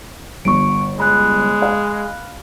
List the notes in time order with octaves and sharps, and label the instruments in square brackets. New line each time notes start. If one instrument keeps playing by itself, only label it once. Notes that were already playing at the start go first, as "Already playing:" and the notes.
[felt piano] G1 [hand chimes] C#6 D7
[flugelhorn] G#3 [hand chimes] B5 F#6
[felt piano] F5